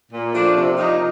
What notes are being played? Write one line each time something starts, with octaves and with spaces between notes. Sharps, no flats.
A#2
F3 A3 D4
C3
F3 A#3 D#4